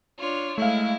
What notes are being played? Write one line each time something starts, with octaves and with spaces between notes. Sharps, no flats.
D4 F4 C#5
G#3 A3 E4 F5